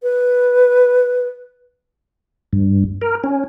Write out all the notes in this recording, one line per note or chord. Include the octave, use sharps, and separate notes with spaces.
B4
G2
A#4
C#4